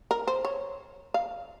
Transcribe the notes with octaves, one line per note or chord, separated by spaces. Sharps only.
A#4
C5
C#5
F5